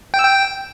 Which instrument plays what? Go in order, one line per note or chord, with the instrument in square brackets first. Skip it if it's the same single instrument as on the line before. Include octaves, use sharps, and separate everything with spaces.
[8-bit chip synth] G5
E6
G5